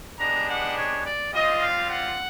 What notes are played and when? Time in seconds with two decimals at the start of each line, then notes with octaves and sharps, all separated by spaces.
0.19 G#3 B3 D4 G4 A#5
0.48 F#5
0.76 C#5
1.04 D5
1.33 G3 C4 F4 D#5
1.61 F5
1.89 F#5